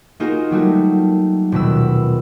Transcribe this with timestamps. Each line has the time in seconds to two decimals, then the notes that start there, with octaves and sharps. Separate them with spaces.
0.20 A#3 D#4 F4 F#4 G#4 A#4
0.51 F#3 G3 A3 F#4
1.52 D#1 B2 B4 E6